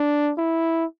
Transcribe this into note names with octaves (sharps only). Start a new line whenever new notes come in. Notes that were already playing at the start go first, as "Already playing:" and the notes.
Already playing: D4
E4